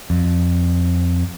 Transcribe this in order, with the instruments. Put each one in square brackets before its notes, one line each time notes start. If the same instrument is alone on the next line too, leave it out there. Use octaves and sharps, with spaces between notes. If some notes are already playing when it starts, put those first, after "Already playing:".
[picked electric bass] F2